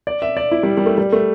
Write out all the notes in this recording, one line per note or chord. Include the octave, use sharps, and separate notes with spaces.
D5
E5
D5
E4
G3
G3
A3
G3
A3